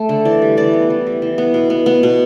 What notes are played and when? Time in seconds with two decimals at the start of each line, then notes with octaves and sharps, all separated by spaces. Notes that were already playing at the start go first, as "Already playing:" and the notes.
Already playing: A3
0.09 D3
0.25 E3 D5
0.42 G3
0.57 E3 D5
0.73 B3
0.90 E3
1.07 G3
1.22 E3
1.38 B3
1.54 B2
1.70 B3
1.86 B3
2.03 B2